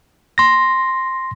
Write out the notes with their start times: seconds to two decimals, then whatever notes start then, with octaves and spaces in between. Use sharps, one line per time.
0.38 C6 A#6